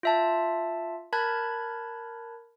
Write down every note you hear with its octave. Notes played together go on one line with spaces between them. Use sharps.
F4 E5 A5
A#4 A5 B5 F#6 G#6